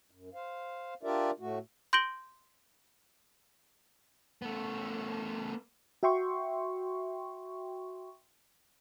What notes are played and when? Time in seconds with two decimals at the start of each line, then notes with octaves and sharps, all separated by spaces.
0.11 F#2
0.34 C5 F5
1.03 D4 F4 G4 A#4 D5 E5
1.40 A2 A3 F#4
1.93 C6 G6 A#6 D7 F#7 G7
4.42 A3 B3
6.03 F#4 E5 G5 C6 C#6